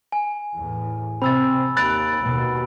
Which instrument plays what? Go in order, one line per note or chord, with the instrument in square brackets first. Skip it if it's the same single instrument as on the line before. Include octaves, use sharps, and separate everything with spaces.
[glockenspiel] G#5
[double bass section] E2 A2
[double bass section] C3 [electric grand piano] C4 [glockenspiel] B5 E6 A6
[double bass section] D#2 [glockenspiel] B5 D7 [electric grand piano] F#6 A6
[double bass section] D#2 B2